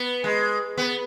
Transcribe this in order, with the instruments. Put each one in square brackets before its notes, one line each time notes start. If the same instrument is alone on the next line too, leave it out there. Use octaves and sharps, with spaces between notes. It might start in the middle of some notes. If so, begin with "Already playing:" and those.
Already playing: [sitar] B3
G#3
B3